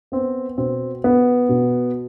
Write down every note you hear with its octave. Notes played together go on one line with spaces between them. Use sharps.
B3 C4
B2 C4
B3
B2